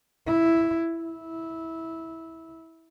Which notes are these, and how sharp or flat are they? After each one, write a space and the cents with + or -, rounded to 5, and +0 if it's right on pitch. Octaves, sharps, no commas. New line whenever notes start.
E4 +0
E4 -15